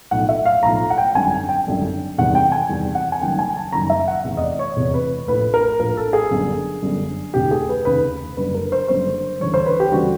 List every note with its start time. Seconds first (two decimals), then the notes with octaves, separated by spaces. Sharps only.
0.11 B1 A2 F3 F#5
0.29 E5
0.46 F5
0.63 B1 A2 F3 A#5
0.90 F#5
0.98 G5
1.15 G#1 F#2 D3 G3 G#5
1.49 G5
1.67 G#1 F#2 D3 G3
2.18 E2 C3 D#3 G3 F#5
2.35 G5
2.52 G#5
2.69 E2 C3 D#3 G3
2.95 F#5
3.12 G#5
3.21 F#1 F#2 D#3 G3 G5
3.39 G#5
3.56 A5
3.72 F#1 F#2 D#3 G3 A#5
3.90 E5
4.08 F#5
4.24 F1 E2 C3
4.37 D#5
4.42 D5
4.59 C#5
4.76 F1 E2 C3
4.94 B4
5.27 A#1 A2 F3 B4
5.54 A#4
5.79 A#1 A2 F3 A#4
5.97 A4
6.13 G#4
6.31 G1 F#2 D3 G3
6.82 G1 F#2 D3 G3
7.34 F1 D#2 C#3 G4
7.51 G#4
7.69 B4
7.85 F1 D#2 C#3 B4
8.37 F#1 F#2 D3 G3 B4
8.55 A#4
8.72 C5
8.88 F#1 F#2 D3 G3 C5
9.40 D2 C#3 E3 G3 C#5
9.54 C5
9.66 B4
9.80 G4
9.91 D2 C#3 E3 G3 F#4